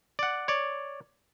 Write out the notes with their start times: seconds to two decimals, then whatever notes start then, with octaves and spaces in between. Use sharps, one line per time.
0.19 D5 F#5
0.48 C#5 D5